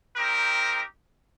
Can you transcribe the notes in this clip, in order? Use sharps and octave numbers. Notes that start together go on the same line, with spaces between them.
C4 D#4 G4 A#4